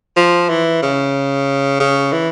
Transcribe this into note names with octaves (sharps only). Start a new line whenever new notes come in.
F3
E3
C#3
C#3
E3